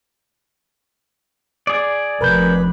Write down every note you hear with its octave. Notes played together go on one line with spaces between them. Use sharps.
G#4 D5
F1 A#4 B4 G6